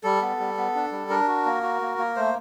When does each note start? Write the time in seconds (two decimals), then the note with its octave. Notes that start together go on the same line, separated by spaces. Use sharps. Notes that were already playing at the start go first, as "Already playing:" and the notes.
0.04 G3 A4
0.22 B3
0.40 G3
0.57 B3
0.75 D4
0.92 G3
1.10 D4 A#4
1.28 F#4
1.46 A#3
1.63 F#4
1.81 A#3
1.98 A#3
2.16 A3 C5